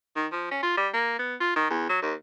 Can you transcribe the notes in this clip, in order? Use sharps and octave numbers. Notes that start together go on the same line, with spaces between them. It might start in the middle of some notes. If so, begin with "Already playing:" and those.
D#3
F3
C#4
F4
G3
A#3
B3
F4
D#3
E2
F#3
D#2